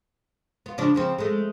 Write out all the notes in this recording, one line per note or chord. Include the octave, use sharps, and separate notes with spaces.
B3 F4
C#3 F3 D4
C#3 F3 C4
G#3 A3